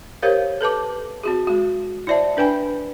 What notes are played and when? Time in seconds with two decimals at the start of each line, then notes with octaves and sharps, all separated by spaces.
0.22 G4 A#4 C5 C#5 F5
0.61 A4 B4 A5 D6
1.23 C4 F#4 G#4
1.47 G#3 F#4
2.07 E4 C5 D5 E5 A5
2.37 D4 B4 G5 G#5 B5